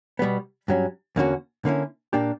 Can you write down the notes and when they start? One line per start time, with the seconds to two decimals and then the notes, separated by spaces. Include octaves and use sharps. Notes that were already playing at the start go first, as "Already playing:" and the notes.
0.19 B2 G3 B3
0.68 G2 F#3 C#4
1.16 E2 D3 A#3 C#4 F#4
1.65 D3 A#3 C#4 E4
2.13 A#2 A#3 D4 G4